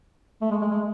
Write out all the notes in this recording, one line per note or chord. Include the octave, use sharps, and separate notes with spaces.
A3
G#3
G#3
G#3